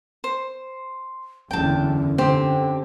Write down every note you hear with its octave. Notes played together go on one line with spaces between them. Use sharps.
C5
F#1 E2 D3 C#4 G5 A5
D3 C4 G4